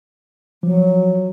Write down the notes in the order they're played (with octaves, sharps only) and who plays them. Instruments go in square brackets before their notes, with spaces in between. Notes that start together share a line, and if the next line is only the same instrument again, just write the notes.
[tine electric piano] F3 [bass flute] F#3